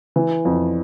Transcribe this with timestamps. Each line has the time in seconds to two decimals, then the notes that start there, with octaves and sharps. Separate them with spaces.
0.16 E3
0.45 F2